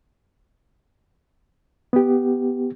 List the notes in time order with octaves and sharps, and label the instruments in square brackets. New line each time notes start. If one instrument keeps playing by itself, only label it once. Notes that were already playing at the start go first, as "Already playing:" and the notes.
[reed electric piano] B3 G4